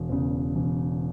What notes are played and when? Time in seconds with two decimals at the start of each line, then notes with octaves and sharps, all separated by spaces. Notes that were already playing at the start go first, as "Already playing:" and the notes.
Already playing: E1
0.09 E2 C#3
0.55 E1